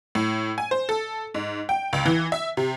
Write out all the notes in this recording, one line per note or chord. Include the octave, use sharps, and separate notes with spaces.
A2
G#5
C5
A4
G#2
G5
C#2
E3
E5
C3